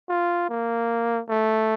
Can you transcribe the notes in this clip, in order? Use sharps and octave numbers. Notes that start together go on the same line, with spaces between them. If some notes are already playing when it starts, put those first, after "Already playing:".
F4
A#3
A3